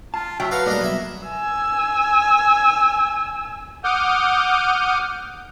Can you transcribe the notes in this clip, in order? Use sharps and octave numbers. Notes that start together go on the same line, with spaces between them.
F4 A5
F#3 E5 G5 A5
B4 F5 F#5 A#5
A#2 G3 A3 D4 A4 A#4 D#5
G2 B2 F#3 E5 B5
G#5 E6
F#5 D6 D#6 F6 G6